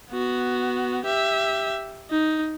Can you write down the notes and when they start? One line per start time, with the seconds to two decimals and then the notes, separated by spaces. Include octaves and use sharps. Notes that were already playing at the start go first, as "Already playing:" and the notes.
0.11 B3 F#4
1.05 G4 E5
2.10 D#4